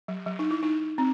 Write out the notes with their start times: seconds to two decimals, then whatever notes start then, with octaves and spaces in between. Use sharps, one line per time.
0.08 F#3
0.26 F#3
0.39 D#4
0.51 E4
0.63 D#4
0.98 C4